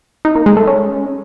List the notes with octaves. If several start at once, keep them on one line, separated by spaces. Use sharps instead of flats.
D#4
A#3
G#3
A3
C#4